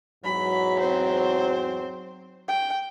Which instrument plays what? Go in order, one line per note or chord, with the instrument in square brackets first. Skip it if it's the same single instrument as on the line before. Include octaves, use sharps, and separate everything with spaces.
[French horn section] E2 G#2 F#3 [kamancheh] B5
[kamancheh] C4 C5
G5